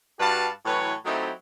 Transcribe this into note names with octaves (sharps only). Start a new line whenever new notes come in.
G2 F#4 G4 B4 F5 A5
A2 E3 F#3 B4 C#5
F#3 A3 C4 D#4 E4 G4